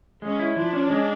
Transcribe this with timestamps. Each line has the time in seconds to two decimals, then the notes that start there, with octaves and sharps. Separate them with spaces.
0.22 G#3 C#4
0.39 E4
0.56 F3 D4
0.73 C#4
0.90 G#3